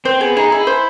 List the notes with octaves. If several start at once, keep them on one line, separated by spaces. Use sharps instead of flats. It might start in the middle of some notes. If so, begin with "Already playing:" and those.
C4 C5
B3 G#4
D#4 G#4
E4 G#4
C5